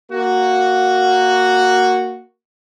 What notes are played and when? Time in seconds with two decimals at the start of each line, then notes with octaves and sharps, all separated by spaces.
0.11 A#3 F#4